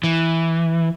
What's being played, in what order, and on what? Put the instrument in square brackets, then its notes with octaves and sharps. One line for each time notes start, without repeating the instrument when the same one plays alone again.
[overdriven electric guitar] E3